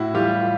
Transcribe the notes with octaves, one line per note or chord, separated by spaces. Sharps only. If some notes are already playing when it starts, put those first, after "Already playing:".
Already playing: A2 E4 F#4
E3 G3 F4 G4
F4